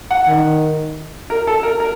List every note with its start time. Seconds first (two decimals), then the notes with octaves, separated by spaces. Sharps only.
0.11 F#5
0.28 D#3
1.30 A#4
1.47 A4
1.63 A#4
1.80 A#4